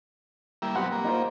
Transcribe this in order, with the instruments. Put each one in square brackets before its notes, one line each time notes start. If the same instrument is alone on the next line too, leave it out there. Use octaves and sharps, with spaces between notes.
[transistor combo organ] G3 A#3 E4
[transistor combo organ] F#3 B3 C4 [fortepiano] G4 F#5
[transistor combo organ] A#3
[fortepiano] D#4 F4 C5